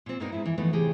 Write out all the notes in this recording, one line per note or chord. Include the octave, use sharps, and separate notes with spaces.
A#2 C4
G2 A#2 A#3 B3 D#4 A#4
G#2 E4
E3
E3 F3 A3 B3 D#4
A2 C3 G4 G#4